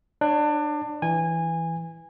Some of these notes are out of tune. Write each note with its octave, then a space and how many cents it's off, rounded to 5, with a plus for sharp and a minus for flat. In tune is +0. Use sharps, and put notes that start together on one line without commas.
D4 +25 C#5 +0
E3 +0 G#5 -20